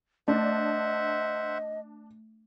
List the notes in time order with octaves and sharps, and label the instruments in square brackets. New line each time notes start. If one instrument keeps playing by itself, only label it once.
[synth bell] A3 [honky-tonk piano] D4 [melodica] C5 E5 F#5 [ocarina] D#5